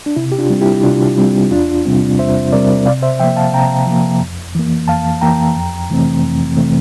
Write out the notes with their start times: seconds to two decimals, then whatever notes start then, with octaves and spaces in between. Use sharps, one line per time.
0.06 D4
0.16 C3 E4
0.32 G4
0.39 D4 F4
0.50 G3 C4
0.61 E4 G4
0.84 C3 D4 F4
1.18 G3 C4
1.51 E2 D4 F4
1.85 C3 G3 C4
2.19 E2 C5 E5
2.53 C3 G3 C4 A#4 D5
2.86 C3 D5 F5
3.02 C5 E5
3.20 F3 E5 G5
3.24 A#3
3.36 F5 A5
3.53 C3 G5 A#5
3.87 F3 A#3
4.21 F2
4.55 E3 A#3
4.88 F2 F5 A5
5.21 E3 A#3 G5 A#5
5.56 F2
5.89 C3 E3 A3 C4
6.24 F2
6.56 C3 E3 A3 C4